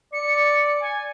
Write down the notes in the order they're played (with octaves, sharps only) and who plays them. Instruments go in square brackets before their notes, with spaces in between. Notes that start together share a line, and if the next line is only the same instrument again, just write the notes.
[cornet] D5 [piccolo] C#7
[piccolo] G#5